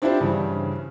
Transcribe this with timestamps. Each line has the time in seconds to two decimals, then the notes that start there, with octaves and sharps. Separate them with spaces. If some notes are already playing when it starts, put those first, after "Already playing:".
0.02 C4 D4 E4 F4 G4 C5
0.20 G2 C#3 E3